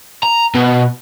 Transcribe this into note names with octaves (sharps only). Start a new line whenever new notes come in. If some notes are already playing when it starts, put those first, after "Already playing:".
A#5
B2